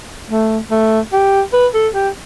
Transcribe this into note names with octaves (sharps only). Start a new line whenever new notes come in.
A3
A3
G4
B4
A4
G4